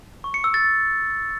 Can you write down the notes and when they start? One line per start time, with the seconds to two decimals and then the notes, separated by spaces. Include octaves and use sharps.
0.24 C#6
0.34 C#7
0.44 E6
0.54 A6